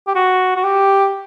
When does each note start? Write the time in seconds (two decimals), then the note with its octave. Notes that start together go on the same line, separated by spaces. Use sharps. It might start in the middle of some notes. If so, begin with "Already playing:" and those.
0.07 G4
0.15 F#4
0.56 F#4
0.64 G4